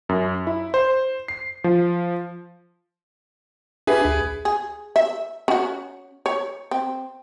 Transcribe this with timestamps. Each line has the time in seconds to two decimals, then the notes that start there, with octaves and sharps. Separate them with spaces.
0.09 F#2
0.47 E4
0.74 C5
1.28 C7
1.64 F3
3.87 D4 G4 G#4 B4 E5
4.05 D2
4.45 G#4
4.96 E5
5.48 C#4 F#4
6.26 C#5
6.71 C4